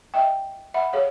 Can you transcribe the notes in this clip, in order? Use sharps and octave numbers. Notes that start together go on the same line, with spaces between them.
D#5 E5 G5
E5 F#5 B5
G#4 C#5 F5